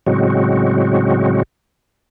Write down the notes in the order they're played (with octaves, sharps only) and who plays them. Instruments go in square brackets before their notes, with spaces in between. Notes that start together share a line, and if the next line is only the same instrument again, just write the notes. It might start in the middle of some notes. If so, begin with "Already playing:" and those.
[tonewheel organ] A2 C#3 F#3 G#3 C4 F#4